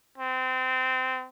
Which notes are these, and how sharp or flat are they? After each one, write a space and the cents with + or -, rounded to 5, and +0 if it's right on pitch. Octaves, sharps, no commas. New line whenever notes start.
C4 -25